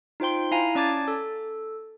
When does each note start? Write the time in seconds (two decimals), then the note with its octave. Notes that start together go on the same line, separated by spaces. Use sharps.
0.20 D#4 F4 C5 G5 C6
0.51 E4 F5 G#5 A#5
0.75 C#4 D5 A5 D6 G#6 A6
1.08 A4